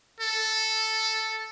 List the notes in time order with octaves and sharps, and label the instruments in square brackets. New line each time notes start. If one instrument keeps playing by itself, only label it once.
[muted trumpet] A4